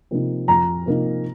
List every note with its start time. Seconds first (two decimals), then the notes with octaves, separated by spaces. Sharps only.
0.11 C3 F3 A#3 D#4
0.48 F2 A#5
0.86 C3 F3 A#3 D#4